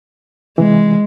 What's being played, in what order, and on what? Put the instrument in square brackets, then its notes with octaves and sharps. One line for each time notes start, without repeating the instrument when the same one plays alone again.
[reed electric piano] C3 E3 [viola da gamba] G#3